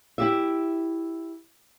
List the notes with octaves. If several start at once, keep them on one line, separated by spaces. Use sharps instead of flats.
E4 G4 E5